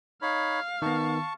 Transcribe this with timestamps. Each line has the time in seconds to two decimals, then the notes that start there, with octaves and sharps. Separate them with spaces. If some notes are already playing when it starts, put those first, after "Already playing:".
0.22 D#4 C#5 F5 B5
0.82 D#3 B3 A5 C#6